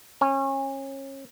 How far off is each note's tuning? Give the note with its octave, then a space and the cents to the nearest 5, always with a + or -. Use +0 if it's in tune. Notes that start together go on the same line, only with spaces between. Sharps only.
C#4 -30